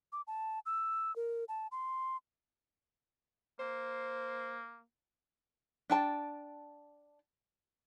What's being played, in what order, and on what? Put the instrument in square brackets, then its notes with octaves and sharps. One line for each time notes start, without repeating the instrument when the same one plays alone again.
[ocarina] D6
A5
E6
A#4
A5
C6
[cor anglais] A#3 [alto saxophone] C5
[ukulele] D4 G5 A5